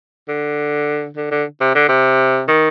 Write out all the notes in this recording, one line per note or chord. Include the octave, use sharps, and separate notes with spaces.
D3
D3
D3
C3
D3
C3
D#3